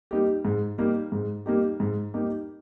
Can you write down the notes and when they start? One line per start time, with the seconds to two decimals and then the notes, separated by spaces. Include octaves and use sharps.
0.11 G3 A#3 D#4 G4
0.45 G#2
0.78 G3 A#3 D#4 G4
1.12 G#2
1.46 G3 A#3 D#4 G4
1.80 G#2
2.14 G3 A#3 D#4 G4